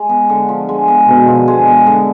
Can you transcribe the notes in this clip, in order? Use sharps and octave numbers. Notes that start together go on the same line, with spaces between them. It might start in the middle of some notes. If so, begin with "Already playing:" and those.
Already playing: G#3
B3
D3
F3
G#3
B3
B2 D3
F3
G#3
B3
D3